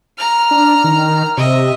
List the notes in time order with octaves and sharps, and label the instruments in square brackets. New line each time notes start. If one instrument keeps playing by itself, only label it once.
[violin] A#5 F6
[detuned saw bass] D4
D#3
[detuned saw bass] C3 [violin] D#5 E5